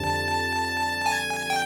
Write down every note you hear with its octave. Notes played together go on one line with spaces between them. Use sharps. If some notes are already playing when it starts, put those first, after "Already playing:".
Already playing: F2 D3 G3 C4 A5
G#5
G5